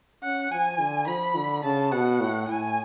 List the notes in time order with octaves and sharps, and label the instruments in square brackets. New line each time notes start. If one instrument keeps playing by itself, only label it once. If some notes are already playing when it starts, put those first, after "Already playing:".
[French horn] C#4 [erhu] F#5
[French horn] F3 [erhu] G#5
[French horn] D3
[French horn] F3 [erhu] B5
[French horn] D3
[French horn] C#3 [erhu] A5
[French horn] B2 [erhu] F#5
[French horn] A2
[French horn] A2 [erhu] G#5